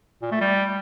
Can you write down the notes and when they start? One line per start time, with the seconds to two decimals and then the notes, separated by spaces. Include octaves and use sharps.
0.22 A#2
0.32 A3
0.41 G3